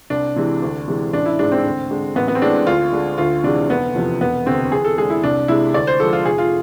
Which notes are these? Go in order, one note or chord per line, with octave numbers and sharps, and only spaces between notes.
C2 D4
C3 E3 G#3
D2
C3 E3 G#3
A1 D4
E4
G#2 E3 G#3 D4
C4
D2
D3 G#3
A1 B3
B3
C4
A2 G#3 D4
D2 F4
D3 G#3
D2 F4
C3 E3 G#3 D4
F1 B3
E2 C3 F3
E1 B3
D2 C3 C4
E2 G#4
A4
D3 G#3 G#4
E4
C2 D4
C3 G#3 E4
D2 D5
C5
D3 F3 G#3 A4
F4
F1 G#4
F4